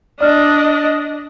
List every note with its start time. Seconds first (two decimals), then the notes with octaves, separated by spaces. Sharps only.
0.21 D4 D5 D#5 F6